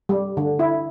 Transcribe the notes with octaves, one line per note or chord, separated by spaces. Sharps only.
G3
D3
E4